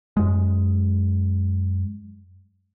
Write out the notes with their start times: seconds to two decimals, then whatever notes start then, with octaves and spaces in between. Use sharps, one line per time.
0.17 F#2 G#3